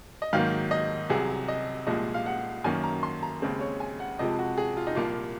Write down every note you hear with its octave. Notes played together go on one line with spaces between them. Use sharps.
D#5
G#2 D#3 F#3 A#3 F5
D#5
C2 C3 F#3 G#4
D#5
C2 A#2 F3 G#3 D#5
F5
F#5
F#2 D#3 F#3 A#3 C#4 G#5
A#5
C6
A#5
D#2 C#3 G#3 C4
C#5
G#5
F#5
F2 C3 F3 G#3 D#5
F#4
G#4
F4
D#4
C2 A#2 F3 A#3 F4